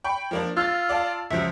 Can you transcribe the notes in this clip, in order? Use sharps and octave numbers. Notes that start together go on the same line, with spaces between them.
G5 B5 C#6
F3 A#3 D4
F4 E6 F6 A6
D5 F5 A5
C#2 F3 F#3 E5